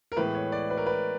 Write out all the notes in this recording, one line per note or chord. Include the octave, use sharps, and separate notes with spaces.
A#4
A2 E3 G#3 B3 B4
C#5
D5
B4
A#4
B4